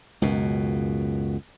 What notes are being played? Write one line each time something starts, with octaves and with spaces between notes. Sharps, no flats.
C#2 F#2 B2